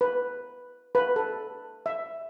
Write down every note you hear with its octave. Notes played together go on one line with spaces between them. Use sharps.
B4
B4
A4
E5